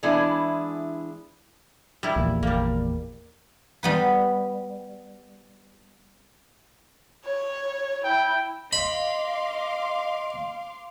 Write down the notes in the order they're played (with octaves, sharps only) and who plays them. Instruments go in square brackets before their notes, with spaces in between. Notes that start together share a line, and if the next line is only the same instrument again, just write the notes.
[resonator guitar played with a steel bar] E3 G#3 B3 D4 E4 G#4
[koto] G3 E4
[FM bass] A#1 [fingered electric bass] E2 A#2 F3
[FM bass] G#1 [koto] G3 A#3
[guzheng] G3 B3 B4
[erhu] C#5
[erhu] E4 [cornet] G5
[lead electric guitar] D#5 [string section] F5 C6 D6 [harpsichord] B5